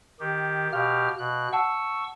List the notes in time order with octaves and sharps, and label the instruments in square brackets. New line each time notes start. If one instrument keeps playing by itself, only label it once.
[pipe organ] D#3 G4
[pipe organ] B2 G4 F6 [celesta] F5
[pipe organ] B2 F#6
[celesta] F#5 A5 [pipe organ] C#6 E6